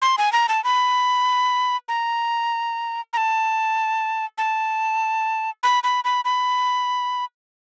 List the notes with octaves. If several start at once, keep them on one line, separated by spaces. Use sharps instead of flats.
C6
G#5
A#5
A5
B5
A#5
A#5
A5
A5
B5
B5
B5
B5